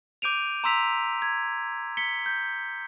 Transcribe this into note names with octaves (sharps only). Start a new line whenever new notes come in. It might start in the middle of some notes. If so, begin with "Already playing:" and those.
D6 G6 D7 D#7 F7
A#5 C6 E6 B6 F7
G#6
B6 C#7 G7
G6